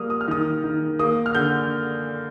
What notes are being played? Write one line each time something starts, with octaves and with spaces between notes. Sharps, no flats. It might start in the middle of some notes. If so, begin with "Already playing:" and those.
Already playing: F3 G3 A#3 D#6 F6
D#6
F6
D#3 D#6
D#3
A#3 D#6
F6
D3 G6